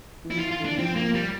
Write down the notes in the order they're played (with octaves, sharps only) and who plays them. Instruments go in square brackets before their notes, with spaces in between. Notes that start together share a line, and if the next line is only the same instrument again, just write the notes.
[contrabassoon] E3
[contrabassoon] F3 [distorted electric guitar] E4
[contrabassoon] E3 [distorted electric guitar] F4
[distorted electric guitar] F4
[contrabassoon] D3
[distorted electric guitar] D4
[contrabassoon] E3
[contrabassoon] F3 [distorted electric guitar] C4
[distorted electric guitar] A#3
G3